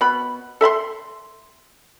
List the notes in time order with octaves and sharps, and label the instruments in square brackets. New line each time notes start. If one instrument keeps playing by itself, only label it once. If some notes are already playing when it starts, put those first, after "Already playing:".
[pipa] B2 B5
A4 E5 B5 C6